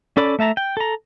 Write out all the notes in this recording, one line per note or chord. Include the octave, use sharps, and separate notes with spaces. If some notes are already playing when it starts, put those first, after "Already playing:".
C#4 A4 D5 B5
A3 E5 A5 A#5
G5
A4 A#5